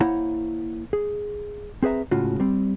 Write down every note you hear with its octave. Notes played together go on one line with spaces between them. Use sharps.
A#3 E4 C5 C#5 F#5 A#5
G#4
C4 G#4 B4 E5 A#5
C#2 A2 C#3 F4 F#4
G3 C4